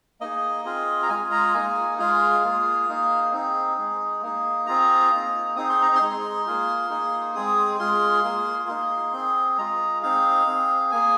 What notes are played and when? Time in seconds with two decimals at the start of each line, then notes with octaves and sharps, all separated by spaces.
0.21 A#3 D#4 G#4 D#5
0.65 C4 F4 G#4
1.03 A#5
1.09 G#3 F4 G#4 G#5
1.32 A#5
1.54 A#3 D#4 G#4 G#5
1.99 G#3 F4 G#4 F5
2.44 A#3 F4 G#4
2.89 A#3 D#4 G#4
3.33 C4 D#4 G#4
3.77 G#3 D#4 G#4
4.23 A#3 D#4 G#4
4.66 C4 F4 G#4 A#5
5.12 A#3 D#4 G#4
5.56 C4 D#4 G#4 D#6
5.69 C6
5.82 A#5
5.95 C6
6.01 G#3 D#4 G#4
6.46 A#3 F4 G#4
6.90 A#3 D#4 G#4
7.35 G#3 C4 G#4 D#6
7.79 G#3 F4 G#4 C6
8.24 A#3 F4 G#4
8.68 A#3 D#4 G#4 C6
9.13 C4 G#4
9.58 G#3 F4 G#4 A#5
10.03 C4 D#4 G#4 F5
10.47 C4 G#4
10.91 A#3 G#4 G#5